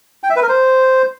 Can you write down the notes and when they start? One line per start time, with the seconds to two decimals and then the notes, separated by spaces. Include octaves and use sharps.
0.24 G5
0.30 E5
0.36 B4
0.42 A#4
0.49 C5